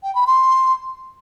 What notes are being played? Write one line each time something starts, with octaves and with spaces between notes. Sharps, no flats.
G5
B5
C6